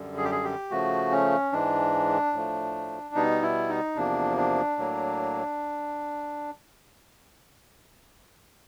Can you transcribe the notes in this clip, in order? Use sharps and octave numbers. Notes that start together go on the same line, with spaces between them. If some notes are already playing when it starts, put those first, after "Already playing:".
Already playing: F#2 D3 G3
G#4
G4
G#4
G4
C#3 F3 A3 F#4
C#4
G#2 E3 G#3 D4
A2 F3 A3
B2 G3 B3 D#4
E4
D#4
E2 C3 F3 A#3 D4
D4
A2 F#3 A#3